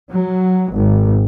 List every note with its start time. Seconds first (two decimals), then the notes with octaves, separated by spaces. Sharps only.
0.11 F#3
0.77 G#1